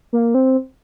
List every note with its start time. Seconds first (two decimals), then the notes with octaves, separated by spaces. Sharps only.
0.13 A#3
0.34 C4